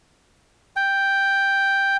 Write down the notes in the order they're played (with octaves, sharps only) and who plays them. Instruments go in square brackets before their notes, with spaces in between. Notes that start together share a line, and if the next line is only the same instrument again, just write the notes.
[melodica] G5